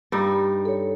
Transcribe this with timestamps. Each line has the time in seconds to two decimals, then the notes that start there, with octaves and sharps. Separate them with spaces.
0.12 G2 G3 D#4
0.65 A4 C#5